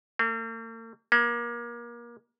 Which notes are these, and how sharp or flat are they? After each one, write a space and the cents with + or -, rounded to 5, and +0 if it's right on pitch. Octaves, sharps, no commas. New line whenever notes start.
A#3 -45
A#3 +30